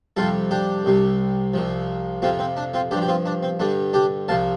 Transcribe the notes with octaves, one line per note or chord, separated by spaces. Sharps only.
F2 C3 G3 F4 A4
D4 G4
C2 C3 G3
C2 C3 F3
F2 C3 F3 C4 F4
C4
D4
C4 F4
G2 F3 D4 G4
G4
C4 F4
D4
C4
G2 D3 G3 D4
D4 G4
C2 C3 F3 F5 A5